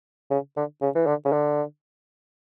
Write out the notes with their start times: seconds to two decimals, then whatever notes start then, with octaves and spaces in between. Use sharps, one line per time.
0.31 C#3
0.56 D3
0.81 C#3
0.95 E3
1.06 D3
1.25 C#3
1.32 D3